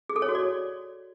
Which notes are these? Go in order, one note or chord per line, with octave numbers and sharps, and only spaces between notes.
G#4
A4
C#5
F#4
D5